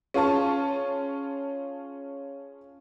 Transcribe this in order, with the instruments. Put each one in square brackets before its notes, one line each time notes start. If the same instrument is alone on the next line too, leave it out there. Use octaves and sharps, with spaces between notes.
[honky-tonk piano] C#4 F4 G#4 A5 C#6